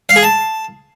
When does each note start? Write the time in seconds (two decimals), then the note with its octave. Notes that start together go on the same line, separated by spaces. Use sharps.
0.09 F5
0.16 G#4
0.23 A5